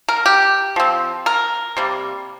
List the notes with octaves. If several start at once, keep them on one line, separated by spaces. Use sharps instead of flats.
A#4
G4
F3 C4
A#4
C3 G3 A#3